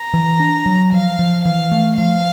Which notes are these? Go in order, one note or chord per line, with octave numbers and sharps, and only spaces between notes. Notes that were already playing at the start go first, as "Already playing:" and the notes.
Already playing: A#5
E3
D4
F#3
F3 F5
F3
E3 F5
A3
F3 F5